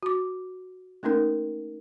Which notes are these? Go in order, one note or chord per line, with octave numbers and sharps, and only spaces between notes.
F#4 D6
A3 A#3 C#4 D#4 A#4